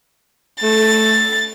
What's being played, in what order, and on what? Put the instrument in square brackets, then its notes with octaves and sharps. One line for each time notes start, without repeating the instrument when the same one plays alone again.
[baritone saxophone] A3 [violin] A6